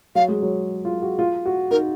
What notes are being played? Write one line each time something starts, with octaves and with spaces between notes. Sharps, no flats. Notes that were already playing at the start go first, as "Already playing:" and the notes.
F#3 F5
G#3
F#3
F4
F#4
F4
F#4
D#4 A#4